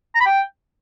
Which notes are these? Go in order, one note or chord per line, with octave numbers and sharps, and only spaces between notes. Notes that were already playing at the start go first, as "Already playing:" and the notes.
A#5
B5
G5